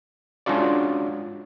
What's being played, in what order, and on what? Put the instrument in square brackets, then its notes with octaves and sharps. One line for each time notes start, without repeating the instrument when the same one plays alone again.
[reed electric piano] G#3 C#4 D4 F4 F#4 D5